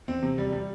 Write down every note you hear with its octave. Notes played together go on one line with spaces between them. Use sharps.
C4
C3
G3
G3